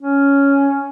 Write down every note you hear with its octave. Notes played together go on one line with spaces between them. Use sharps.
C#4